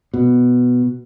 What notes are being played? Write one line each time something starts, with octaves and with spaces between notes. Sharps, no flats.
B2